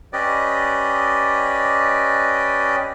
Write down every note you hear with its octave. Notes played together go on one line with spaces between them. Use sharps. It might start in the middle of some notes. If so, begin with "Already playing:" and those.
C#4 G4 B4 D5 D#5